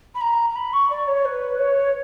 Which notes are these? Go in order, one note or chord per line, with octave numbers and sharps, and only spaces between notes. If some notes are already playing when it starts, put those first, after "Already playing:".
B5
A#5
A#5
B5
C#6
D5
C#5
B4
C#5